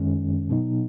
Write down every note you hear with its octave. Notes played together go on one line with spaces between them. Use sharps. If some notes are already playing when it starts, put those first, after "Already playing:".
Already playing: F#2 D#3 G#3 C#4
B2 F#3 B3 D#4